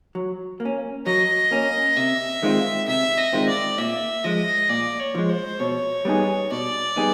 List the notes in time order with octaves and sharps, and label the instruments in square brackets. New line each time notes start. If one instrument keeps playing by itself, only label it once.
[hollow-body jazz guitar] F#3
A#3
C#4
[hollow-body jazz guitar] F#3 [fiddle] D#5
[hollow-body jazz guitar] A#3 C#4
[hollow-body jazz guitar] C3 [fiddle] E5
[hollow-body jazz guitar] D#3 G#3 C4 F4
[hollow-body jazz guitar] C3 [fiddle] E5
[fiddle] D#5
[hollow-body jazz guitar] D#3 G#3 C4 F4
[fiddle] D5
[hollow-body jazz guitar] A#2 [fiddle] E5
[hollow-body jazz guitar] F3 G#3 [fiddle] D#5
[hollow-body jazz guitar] A#2 [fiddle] D5
[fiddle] C#5
[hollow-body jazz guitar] F3 G#3
[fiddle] C5
[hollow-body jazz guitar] B2 [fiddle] C#5
[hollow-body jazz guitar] G3 B3 D#4 G#4
[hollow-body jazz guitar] B2 [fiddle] D5
[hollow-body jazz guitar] G3 B3 D#4 G#4